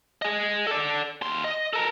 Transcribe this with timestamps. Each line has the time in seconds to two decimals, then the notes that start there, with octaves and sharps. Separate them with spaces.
0.22 G#4 D#5
0.67 A4 D5
1.22 D#2 C6
1.44 D#5
1.73 A4 A#4